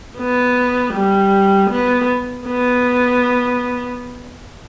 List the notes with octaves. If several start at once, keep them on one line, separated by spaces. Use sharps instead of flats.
B3
G3
B3
B3